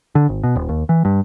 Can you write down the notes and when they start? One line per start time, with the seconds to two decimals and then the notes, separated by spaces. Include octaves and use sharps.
0.15 D3
0.29 G#1
0.43 B2
0.56 D#1
0.69 D#2
0.89 E3
1.05 G2